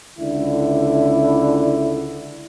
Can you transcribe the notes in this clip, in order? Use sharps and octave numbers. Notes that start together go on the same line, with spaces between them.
C#2 D3 E4